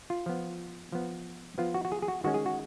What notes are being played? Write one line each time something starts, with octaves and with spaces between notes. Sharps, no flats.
F4
F3 B3
F3 B3
F3 B3 F4
F#4
F#4
G#4
G#4
F#4
D#3 G#3 C#4 F#4
G#4
F#4